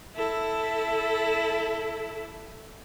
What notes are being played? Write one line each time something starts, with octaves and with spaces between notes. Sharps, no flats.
E4 A4